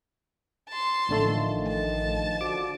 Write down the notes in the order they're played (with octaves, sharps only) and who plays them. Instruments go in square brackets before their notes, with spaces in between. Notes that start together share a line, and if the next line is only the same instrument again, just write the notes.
[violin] A5 C6
[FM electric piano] A1 D3 A3 [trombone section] D#3 F3
[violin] A5
[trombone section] D3 F3 F#4 [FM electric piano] D6